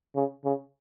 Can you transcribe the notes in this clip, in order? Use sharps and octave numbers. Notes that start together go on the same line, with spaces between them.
C#3
C#3